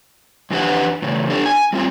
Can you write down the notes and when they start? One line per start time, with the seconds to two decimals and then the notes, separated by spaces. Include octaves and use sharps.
0.51 F2 E3 D4 G4 B4 F#5
1.02 A2 C#3 E3
1.30 D4 G4 A4
1.46 G#5
1.73 G3 C4 F4